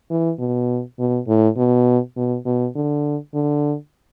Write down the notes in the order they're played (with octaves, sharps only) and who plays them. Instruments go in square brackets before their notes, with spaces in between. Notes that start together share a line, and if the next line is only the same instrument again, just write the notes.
[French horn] E3
B2
B2
A2
B2
B2
B2
D3
D3